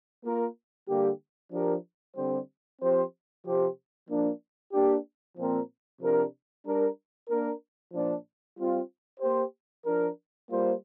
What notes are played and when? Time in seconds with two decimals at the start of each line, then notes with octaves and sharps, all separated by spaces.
0.24 A#3 F4 A#4
0.88 D3 G3 A#3 G4
1.52 F3 D4 G4 A#4
2.16 D3 G3 C4 G4 C5
2.80 F3 C4 G4 C5
3.44 C3 F3 C4 G4 C5
4.08 F3 A#3 D4
4.72 A#3 D4 G4
5.37 A#2 F3 C4 A#4
6.01 C3 F3 D4 A#4
6.65 G3 D4 A#4
7.29 A#3 D4 A#4
7.93 A#2 F3 D4
8.57 G3 C4 F4
9.20 A#3 G4 C5
9.85 F3 D4 A#4
10.50 G3 A#3 F4 C5